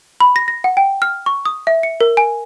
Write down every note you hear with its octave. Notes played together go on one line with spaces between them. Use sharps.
B5
A#6
A#6
F#5
G5
F6
C#6
D#6
E5
C#7
A#4
G#5